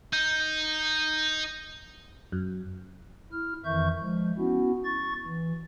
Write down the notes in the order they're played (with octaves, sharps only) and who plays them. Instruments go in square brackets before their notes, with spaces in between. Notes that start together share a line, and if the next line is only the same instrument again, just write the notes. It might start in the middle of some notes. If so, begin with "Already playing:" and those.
[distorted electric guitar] D#4 [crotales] G6
[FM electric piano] F#2
[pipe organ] E4 F6
F2 D#3 E3 E5 C#6 G6
F3 G#3
B3 C#4 E4 F#4
C#6 A6
E3